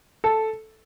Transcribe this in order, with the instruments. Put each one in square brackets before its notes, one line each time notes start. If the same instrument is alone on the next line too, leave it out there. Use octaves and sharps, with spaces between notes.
[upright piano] A4